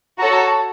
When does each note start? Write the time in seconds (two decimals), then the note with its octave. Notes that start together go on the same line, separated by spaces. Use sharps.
0.19 F#4 A4 C#5 A#5
0.33 A5
0.47 A5